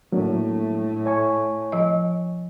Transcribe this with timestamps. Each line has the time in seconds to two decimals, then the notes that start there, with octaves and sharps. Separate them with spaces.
0.12 A2 F#3 A3 A#3 D4
1.06 C#5 G#5 C#6
1.72 F3 D#5